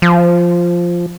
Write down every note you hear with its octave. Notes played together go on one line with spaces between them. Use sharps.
F3